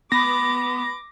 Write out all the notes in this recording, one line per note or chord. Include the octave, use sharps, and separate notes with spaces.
B3 B5 D6 A#6